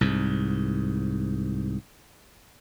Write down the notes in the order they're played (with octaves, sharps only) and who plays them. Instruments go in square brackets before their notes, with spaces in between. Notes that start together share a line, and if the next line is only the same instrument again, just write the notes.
[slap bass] C2 G#2